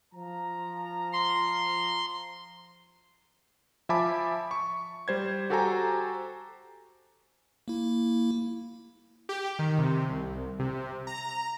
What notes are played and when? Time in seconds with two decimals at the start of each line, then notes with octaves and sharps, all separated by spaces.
0.13 F3 A#5
1.13 C6
3.89 F3 E5 G#5 A5 B5 D6
4.51 C#6
5.08 G3 C5 G#6
5.50 F#4 G4 A4 C5 G#5 A#5
7.68 A#3 E4
9.29 G4
9.59 D#3
9.78 C3
10.09 C2
10.59 C3
11.07 A#5